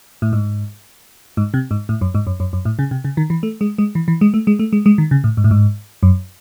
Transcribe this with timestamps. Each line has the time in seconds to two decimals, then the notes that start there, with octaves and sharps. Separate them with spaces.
0.22 A2
0.33 G#2
1.37 G#2
1.54 C3
1.71 G#2
1.89 A2
2.01 F#2
2.15 G#2
2.27 F#2
2.40 F#2
2.53 F#2
2.65 A2
2.79 C#3
2.91 C3
3.04 C#3
3.17 D#3
3.30 E3
3.43 A3
3.61 G#3
3.78 G#3
3.95 E3
4.08 E3
4.21 G#3
4.34 A3
4.47 G#3
4.59 A3
4.73 G#3
4.86 G#3
4.98 D#3
5.11 C#3
5.24 A2
5.37 G#2
5.44 A2
5.51 G#2
6.03 F#2